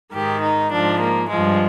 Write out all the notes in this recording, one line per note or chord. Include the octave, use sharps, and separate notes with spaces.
G#2 D#3 G4
D#4
G#2 F3 D4
A#3
G2 F3 G#3